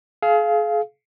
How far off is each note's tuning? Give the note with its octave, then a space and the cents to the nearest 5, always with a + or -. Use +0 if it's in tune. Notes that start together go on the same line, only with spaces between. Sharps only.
G#4 +40 F5 -10